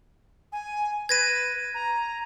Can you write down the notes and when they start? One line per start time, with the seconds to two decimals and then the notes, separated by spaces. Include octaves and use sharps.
0.52 G#5
1.09 B4 G#6 A#6 D#7
1.74 A#5